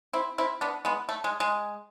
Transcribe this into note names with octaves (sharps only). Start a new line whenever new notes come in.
C4 E4
C4 E4
B3 D4
G#3 B3
A3
G#3
G#3